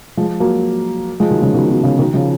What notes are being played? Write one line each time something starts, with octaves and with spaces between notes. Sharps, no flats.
F3 G#3
F#3 A#3
F3 G#3
D#3 F#3
C#3 F3
B2 D#3
B2
C#3
B2 D#3
C#3 F3